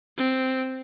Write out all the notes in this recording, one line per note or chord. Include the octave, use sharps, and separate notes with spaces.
C4